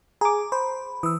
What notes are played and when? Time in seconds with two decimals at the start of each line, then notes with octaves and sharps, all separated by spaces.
0.21 G#4 A#5 D6
0.52 C5 B5
1.03 E3 D#6 E6